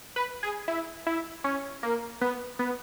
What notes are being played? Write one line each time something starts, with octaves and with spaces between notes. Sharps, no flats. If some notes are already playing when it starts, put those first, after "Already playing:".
B4
G#4
E4
E4
C#4
A#3
B3
B3